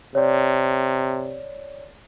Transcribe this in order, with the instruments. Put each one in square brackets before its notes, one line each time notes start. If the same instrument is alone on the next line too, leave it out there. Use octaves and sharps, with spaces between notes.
[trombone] C3 [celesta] C#5 D5